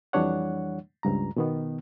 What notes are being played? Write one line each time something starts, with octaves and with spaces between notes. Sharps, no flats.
F2 E3 G3 D4 C#5 F#5
C#2 G2 A#5
B2 D#3 B3